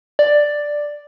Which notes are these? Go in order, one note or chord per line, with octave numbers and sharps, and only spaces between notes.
D5